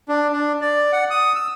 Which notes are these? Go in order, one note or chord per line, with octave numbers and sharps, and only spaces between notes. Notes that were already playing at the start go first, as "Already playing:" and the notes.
D4
D4
D5
F#5
D#6
E6